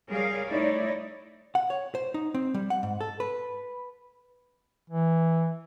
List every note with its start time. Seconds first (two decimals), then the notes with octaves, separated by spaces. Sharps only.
0.11 G3 G#4 A#4 C#5 F5
0.50 A3 D#4 E4 C#5 D5
1.55 F#5
1.70 C#5
1.95 C5
2.14 D#4
2.34 C4
2.54 G3
2.70 F#5
2.83 G#2
3.01 A4
3.20 B4
4.90 E3